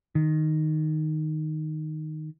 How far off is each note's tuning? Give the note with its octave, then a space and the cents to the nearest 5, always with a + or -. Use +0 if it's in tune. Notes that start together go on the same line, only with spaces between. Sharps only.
D#3 -5